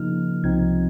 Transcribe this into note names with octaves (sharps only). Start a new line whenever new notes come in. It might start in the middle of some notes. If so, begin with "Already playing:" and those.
Already playing: C#3 F3 A#3 D#4 F6
C2 C3 F3 C4 D#4 G#6